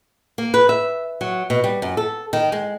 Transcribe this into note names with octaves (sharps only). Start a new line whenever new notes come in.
A#3
B4
E5
F#3
B2
G3
F#2
A4
D#3
G#3